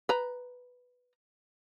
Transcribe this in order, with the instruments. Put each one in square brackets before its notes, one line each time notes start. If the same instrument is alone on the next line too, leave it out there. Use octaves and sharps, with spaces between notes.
[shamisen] B4 A#5